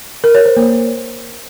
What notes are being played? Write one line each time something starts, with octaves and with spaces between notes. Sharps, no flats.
A#4
C#5
C5
A#3